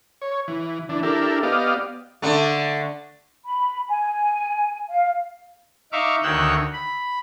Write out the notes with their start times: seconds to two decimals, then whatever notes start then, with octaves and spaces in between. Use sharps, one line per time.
0.22 C#5
0.48 E3
0.89 E3 D4
1.03 D4 E4 G4 A4 A#4
1.43 B3 G4 D5 D#5 F5
2.22 D3 A3
3.45 B5
3.87 G#5
4.88 F5
5.92 D#4 E5 F5 C#6 D6
6.23 D2 D#3 C#5 E6 F#6 G6
6.73 B5